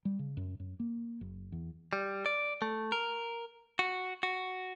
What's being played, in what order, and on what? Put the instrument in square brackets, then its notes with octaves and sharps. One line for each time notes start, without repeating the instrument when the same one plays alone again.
[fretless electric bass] G3
C#3
F#2
F#2
A#3
F#1
E2
[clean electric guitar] G3
D5
A3
A#4
F#4
F#4